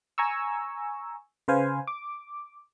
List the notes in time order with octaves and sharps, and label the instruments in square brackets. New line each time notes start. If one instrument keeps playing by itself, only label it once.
[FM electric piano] G#5 A#5 C#6 E6
C#3 B4 C5 F5 G#5
D6